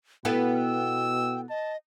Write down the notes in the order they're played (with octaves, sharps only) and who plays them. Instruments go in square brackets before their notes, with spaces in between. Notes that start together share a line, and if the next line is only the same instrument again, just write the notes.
[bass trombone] B2 [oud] B3 E4 A4 [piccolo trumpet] B4 [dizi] G5
[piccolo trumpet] E6
[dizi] D#5 [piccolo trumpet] A5